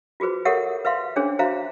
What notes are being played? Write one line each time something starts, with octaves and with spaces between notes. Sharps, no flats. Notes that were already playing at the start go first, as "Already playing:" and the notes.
F4 F#4 G#4 B4 C5
G4 A4 A#4 C#5 E5 F#5
B4 E5 F5 C6
C#4 D4 G#4 C5 C#5
F#4 C5 E5 F5 A#5